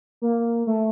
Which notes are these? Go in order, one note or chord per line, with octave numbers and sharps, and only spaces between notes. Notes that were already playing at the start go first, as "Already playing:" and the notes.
A#3
A3